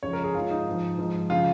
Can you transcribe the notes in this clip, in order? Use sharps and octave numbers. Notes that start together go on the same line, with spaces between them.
C#2 C#3 F3 C#5
A#4
G#4
G#2 F3 F4
D#4
G#2 F3
G#2 F3
C#3 F3 F4